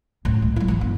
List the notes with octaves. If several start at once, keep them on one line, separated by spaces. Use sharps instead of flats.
C#2 A2
G#3
G3 E4
G#2 E3
G1